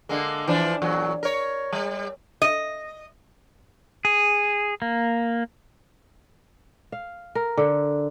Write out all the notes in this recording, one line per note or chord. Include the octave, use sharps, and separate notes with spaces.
D3 G#3 A#3
E3 F3 D4
E2 A#2 F#3
A#4 C#5
G3
D#5
G#4
A#3
F5
A#4
D3